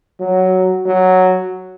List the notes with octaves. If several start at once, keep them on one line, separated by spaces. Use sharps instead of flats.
F#3
F#3